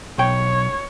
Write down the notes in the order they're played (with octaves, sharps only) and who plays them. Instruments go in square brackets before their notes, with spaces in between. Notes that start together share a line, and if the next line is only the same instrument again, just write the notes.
[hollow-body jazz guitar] B1 G5 [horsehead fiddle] C#5